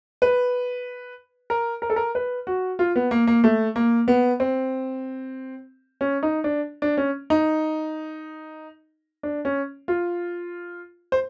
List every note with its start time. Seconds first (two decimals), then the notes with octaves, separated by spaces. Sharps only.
0.22 B4
1.50 A#4
1.82 A#4
1.90 A4
1.96 A#4
2.15 B4
2.47 F#4
2.79 F4
2.96 B3
3.11 A#3
3.27 A#3
3.44 A3
3.76 A#3
4.08 B3
4.40 C4
6.01 C#4
6.23 D#4
6.44 D4
6.82 D4
6.97 C#4
7.30 D#4
9.23 D4
9.45 C#4
9.88 F4
11.12 C5